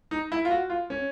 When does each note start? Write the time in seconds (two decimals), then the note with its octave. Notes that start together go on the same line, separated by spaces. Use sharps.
0.11 D#4
0.32 E4
0.45 F4
0.50 F#4
0.70 F4
0.90 C#4